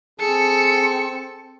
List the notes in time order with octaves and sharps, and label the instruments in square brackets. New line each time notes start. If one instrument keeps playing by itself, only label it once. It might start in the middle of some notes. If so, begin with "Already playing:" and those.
[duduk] C4 [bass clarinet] G#4 [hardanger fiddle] A4 [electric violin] C#7